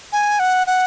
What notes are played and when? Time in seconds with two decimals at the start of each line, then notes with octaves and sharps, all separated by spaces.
0.12 G#5
0.39 F#5
0.67 F#5